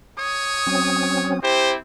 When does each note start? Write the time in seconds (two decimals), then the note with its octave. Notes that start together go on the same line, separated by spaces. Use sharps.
0.19 C#5 D#6
0.66 F#3 C4 C#4
1.43 C4 E4 G4 C5